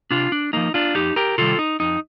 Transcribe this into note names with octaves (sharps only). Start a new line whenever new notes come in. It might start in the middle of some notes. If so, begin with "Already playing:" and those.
C3 D4 F4
D4
F3 A#3 D#4
D4 F4
F2 D#4 G4
G4 A#4
C3 D#3 G3 F4 A4
D#4
F2 D#4